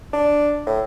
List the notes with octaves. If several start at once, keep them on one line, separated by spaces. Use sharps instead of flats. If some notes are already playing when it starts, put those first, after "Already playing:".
D4
A2